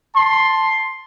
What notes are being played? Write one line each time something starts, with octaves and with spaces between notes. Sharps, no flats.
A5 C6